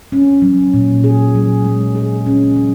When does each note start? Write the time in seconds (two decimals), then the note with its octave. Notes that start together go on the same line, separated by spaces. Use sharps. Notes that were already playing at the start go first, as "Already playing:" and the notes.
0.12 C#4
0.42 F#3
0.74 A#2
1.04 G#4
1.35 F#3
1.64 G#3
1.95 G#4
2.26 C#4
2.56 F#3